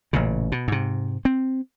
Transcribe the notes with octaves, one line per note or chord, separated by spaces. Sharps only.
A1 A#2 C#3
B2
G#2 C3
C4